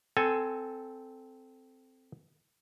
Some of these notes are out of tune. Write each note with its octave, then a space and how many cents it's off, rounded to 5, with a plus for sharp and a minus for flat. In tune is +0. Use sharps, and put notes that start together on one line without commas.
C4 -10 A4 +0 G#5 +10